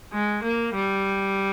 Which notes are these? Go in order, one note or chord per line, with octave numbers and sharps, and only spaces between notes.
G#3
A#3
G3